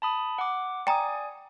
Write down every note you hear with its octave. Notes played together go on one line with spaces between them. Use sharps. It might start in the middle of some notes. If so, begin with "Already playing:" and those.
A5 B5 D#6
F#5 D6
D5 G5 G#5 A#5 D#6